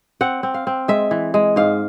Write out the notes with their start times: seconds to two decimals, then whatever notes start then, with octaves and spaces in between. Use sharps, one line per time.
0.21 C4 F#5
0.43 C4
0.54 F5
0.67 C4
0.88 G#3 E5
1.11 E3
1.34 G#3
1.56 G#2 F5